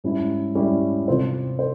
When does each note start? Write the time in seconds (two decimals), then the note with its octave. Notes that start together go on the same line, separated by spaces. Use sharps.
0.04 G#2 G3 C#4 E4
0.55 G#2 G3 C#4 E4
1.08 C3 F3 C4 F4 C5
1.59 C5